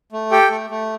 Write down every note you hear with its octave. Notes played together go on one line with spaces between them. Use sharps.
A3
G4 A4 G5
A3
A3